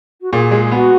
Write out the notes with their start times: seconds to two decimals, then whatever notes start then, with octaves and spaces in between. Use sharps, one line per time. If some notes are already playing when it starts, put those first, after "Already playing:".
0.22 F#4
0.33 A#2 G#4
0.51 G#3
0.71 B3 F#4